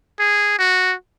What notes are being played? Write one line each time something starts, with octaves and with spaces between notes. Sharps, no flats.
G#4
F#4